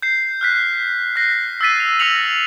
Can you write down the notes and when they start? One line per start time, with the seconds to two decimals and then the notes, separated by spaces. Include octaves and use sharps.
0.02 G6 C7
0.41 F6 F#6 B6
1.16 F#6 A#6 C7
1.61 E6 F6 A6 B6 D#7
1.80 F7
1.99 E6 F6 A#6 C#7 F7 F#7